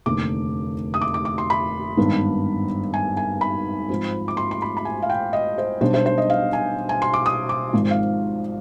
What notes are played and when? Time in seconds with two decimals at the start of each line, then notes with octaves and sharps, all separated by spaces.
0.06 F1 D#2 D3 D6
0.94 D#6
1.01 D6
1.14 D6
1.25 D6
1.38 C6
1.50 B5
1.97 G#1 G2 D#3 B3
2.94 G#5
3.17 G#5
3.41 B5
3.89 G#2 F3 C4
4.28 D6
4.37 C6
4.51 C6
4.62 B5
4.77 B5
4.85 G#5
5.02 F5
5.10 G5
5.33 D#5
5.58 C5
5.81 B1 B2 G3 D4 C5
5.94 C5
6.06 C5
6.18 D#5
6.30 F5
6.53 G#5
6.89 G#5
7.02 C6
7.14 D6
7.26 D#6
7.49 D6
7.73 G#1 G#2 F3
7.91 F5